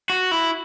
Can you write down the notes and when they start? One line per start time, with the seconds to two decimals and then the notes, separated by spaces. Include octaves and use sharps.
0.10 F#4
0.31 E4